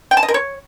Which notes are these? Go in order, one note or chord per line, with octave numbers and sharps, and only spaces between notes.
G5
A5
D#5
A#4
C#5